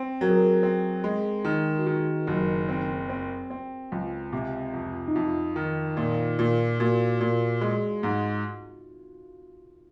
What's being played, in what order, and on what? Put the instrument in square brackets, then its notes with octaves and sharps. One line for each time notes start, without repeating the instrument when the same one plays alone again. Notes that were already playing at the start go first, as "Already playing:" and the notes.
Already playing: [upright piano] C4
[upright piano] F#3 [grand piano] A#4
[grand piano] G#4
A#4
[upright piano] C4
G#3
D#3
[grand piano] F#4
[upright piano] D#3 [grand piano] G#4
[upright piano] F#1
C4
C4
C4
C#2
C3
F2
[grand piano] D#4
[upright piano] F2 [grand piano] F4
[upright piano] D#3
[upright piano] A#2 [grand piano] F4
[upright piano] A#2
[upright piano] A#2 [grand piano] F#4
[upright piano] A#2
G#3
G#2